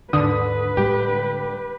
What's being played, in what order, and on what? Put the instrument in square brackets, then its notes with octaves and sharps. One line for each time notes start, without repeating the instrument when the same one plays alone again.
[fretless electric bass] D#2 G#2 [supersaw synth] D3 [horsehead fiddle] B4 [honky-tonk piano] D#6
[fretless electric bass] A2 G3 G#3 [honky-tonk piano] G4